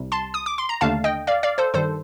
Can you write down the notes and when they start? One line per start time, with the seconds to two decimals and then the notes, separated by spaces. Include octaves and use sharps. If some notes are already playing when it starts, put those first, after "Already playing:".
Already playing: C2 C3 G3
0.12 A5 C6
0.34 D#6
0.46 D6
0.58 C6
0.69 A#5
0.81 D#2 D3 A3 D4 F5 A5
1.04 D#5 G5
1.27 D5 F5
1.43 D5 F5
1.58 A4 C5
1.74 G2 D#3 G3 A4 C5